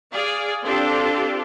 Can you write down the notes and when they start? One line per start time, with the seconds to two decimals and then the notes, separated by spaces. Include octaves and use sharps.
0.12 G#4 D5 F5
0.63 C4 D4 F4 G4 A4